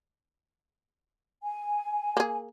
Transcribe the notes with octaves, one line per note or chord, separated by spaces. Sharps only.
G#5
A#3 G#4